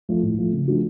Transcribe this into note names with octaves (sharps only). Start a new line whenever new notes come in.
F3 A3
A2
F3 A3
C#3
F3 A3 D4 F#4